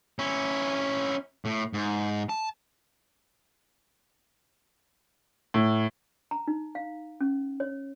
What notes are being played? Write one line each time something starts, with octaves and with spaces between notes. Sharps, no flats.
C#4 E4
A2
G#2
A5
A2
A#5
D#4
F5
C#4
C#5